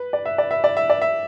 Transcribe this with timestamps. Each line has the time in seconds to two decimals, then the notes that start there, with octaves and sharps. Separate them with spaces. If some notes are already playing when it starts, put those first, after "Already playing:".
Already playing: B4
0.13 D5
0.26 E5
0.38 D5
0.51 E5
0.64 D5
0.77 E5
0.90 D5
1.02 E5